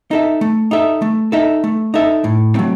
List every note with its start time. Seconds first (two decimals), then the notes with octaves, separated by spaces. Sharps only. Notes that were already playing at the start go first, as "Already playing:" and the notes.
0.11 D#4 A4 E5
0.41 A3
0.71 D#4 A4 E5
1.02 A3
1.32 D#4 A4 E5
1.64 A3
1.94 D#4 A4 E5
2.24 A2
2.55 F#3 A3 C4